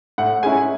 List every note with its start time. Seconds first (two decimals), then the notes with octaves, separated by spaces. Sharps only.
0.18 A2 F#5
0.43 G#3 C#4 E4 G#5